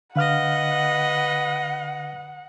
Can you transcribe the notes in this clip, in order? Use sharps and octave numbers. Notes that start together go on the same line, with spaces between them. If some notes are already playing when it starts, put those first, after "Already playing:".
D3 B4 D#5 F5 F#5 F6